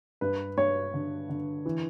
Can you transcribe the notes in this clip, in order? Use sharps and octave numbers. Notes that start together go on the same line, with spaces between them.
G2 B4
G2 C#5
D3
D3
E3